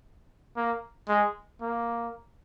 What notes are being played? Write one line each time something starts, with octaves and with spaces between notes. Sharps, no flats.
A#3
G#3
A#3